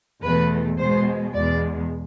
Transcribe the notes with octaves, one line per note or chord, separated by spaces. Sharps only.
E2 B2 A3 B4
B2 G#3 C5
E2 B2 G#3 D5